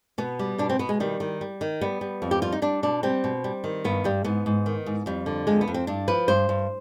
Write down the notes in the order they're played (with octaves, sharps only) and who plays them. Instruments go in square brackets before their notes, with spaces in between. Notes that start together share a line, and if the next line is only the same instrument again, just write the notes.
[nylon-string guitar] B2 B3
G3
B2 D4
C4
B2 B3
G#3
D#3 G3
D#3
G3
D#3
G3 B3
G3
F2
G4
G3 F4
D#4
G3 D4
B2 D4
G3 C4
B2
G3
D#3
G2 B3
G2 G3
G#2 B3
G#2
D#3
G#2
F2 G3
D3
F2 G#3
B3
F2
C4
G2 D4
F3 B4
G2 C5
G2